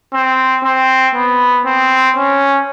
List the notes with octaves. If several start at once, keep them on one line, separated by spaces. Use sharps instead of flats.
C4
C4
B3
C4
C#4